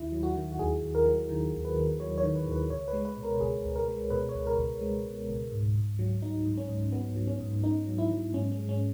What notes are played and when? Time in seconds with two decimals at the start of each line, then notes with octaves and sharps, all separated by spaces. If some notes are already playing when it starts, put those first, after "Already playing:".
Already playing: D#2 E4
0.12 F#3
0.23 F#4
0.35 D#3
0.52 F#4
0.59 D#2 G#4
0.82 D#2
0.95 A#4
1.06 F#3
1.29 D#3
1.53 D#2
1.65 B4
1.76 D#2
2.00 F#3 C#5
2.18 C#5
2.23 D#3
2.35 B4
2.46 D#2
2.52 B4
2.70 C#2 C#5
2.88 B4
2.93 G#3
3.05 B4
3.17 B2
3.23 A#4
3.41 C#2 G#4
3.64 C#2
3.76 A#4
3.88 G#3
4.10 B2 B4
4.29 C#5
4.34 C#2
4.47 A#4
4.58 C#2
4.81 G#3
5.06 B2
5.29 C#2
5.52 G#2
5.76 G#2
5.99 F#3
6.22 F#3 D#4
6.46 G#2
6.58 C#4
6.69 G#2
6.92 F#3 B3
7.16 F#3
7.27 C#4
7.40 G#2
7.63 G#2 D#4
7.87 F#3
7.98 E4
8.10 F#3
8.34 G#2 C#4
8.52 C#4
8.57 G#3
8.69 C#4